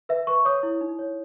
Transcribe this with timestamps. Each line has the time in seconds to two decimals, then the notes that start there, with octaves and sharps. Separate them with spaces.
0.09 B4 E5
0.27 B4 C#6
0.45 C#5 D#6
0.63 E4
0.81 D#4
0.99 C#5